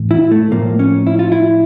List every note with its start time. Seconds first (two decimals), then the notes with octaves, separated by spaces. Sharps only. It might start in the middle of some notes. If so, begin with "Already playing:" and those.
Already playing: A2 E3
0.11 E4
0.31 A3
0.52 A2 F3 A#3
0.79 C#4
1.07 E4
1.19 F4
1.32 E4